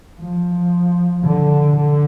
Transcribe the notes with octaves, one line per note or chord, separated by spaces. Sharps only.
F3
D3
D3